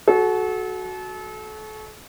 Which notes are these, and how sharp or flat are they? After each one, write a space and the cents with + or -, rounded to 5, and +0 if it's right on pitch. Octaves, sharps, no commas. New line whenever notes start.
F#4 +0 A4 -35